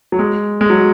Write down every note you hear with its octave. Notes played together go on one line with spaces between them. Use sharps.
F#3
G#3
G#3
F#3